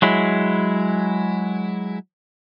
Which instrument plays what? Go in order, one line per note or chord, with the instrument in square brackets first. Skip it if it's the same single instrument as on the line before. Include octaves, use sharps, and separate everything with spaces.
[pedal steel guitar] F#3 G#3 E4